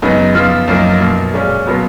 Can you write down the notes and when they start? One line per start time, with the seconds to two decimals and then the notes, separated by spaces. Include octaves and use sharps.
0.02 F#2 C#3 G#3 B3 D#4
0.35 F3 B3 F4
0.68 F#2 F3 A#3 D#4 A#4
1.00 B2 A#3 F4
1.33 A#2 G#3 C#4
1.66 B2 F#3 B3 F4 A#4